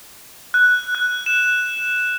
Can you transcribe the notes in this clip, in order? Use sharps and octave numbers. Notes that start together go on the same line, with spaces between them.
F#6
F#6
E7